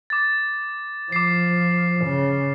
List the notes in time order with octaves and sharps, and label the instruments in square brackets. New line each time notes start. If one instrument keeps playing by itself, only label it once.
[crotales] D6 A6
[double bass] F3 [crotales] D6 C7
[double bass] C#3